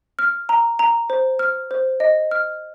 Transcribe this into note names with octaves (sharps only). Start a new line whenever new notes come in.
F6
A#5
A#5
C5
F6
C5
D#5
F6